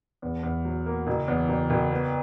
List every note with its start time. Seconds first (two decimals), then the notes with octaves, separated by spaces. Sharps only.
0.22 E2
0.43 E2
0.65 F#3
0.86 A#3
1.07 F#1
1.28 E2
1.49 F#1
1.70 F#1
1.91 B3